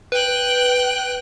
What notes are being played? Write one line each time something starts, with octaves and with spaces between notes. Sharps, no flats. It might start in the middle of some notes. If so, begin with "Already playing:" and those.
B4 G5 F#6